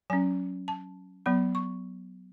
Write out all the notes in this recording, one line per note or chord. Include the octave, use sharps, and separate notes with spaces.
F#3 C#4 G#5
A5
F#3 B3 B5
C#6